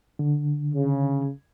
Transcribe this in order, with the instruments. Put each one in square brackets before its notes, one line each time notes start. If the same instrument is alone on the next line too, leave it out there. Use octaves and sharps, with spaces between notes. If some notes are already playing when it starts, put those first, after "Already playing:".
[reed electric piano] D3
[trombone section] C#3